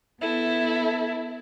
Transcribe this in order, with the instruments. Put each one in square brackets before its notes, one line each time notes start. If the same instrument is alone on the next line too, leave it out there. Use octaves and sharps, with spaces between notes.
[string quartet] B3 E4 A4